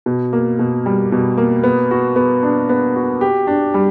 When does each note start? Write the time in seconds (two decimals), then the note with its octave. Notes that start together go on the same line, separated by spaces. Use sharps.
0.06 B2
0.33 A#3
0.59 B2
0.86 G3
1.12 B2
1.38 A#3
1.63 B3
1.91 F#4
2.16 B3
2.43 D4
2.69 B3
2.96 F#4
3.21 G4
3.47 D4
3.74 G3